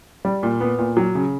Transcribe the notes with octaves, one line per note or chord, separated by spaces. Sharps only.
G3
A#2
B3
A#2
F#3
C#3